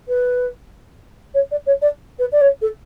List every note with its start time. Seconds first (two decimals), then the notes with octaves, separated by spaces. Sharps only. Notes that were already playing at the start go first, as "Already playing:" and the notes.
0.08 B4
1.34 C#5
1.51 D5
1.66 C#5
1.82 D5
2.19 B4
2.32 D5
2.41 C#5
2.62 A4